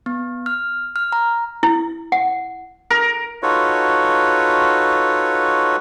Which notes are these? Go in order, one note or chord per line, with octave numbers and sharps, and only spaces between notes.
B3
F6
F6
A#5
E4
F#5
A#4
D#4 F4 F#4 A4 B4 C#5